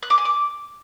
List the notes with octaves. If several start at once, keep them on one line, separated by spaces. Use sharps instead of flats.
F#6
D6
G#5
D6